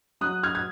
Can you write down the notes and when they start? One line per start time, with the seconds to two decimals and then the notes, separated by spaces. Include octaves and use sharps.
0.21 F#3 D#6 F#6
0.43 F6 G#6
0.55 G#6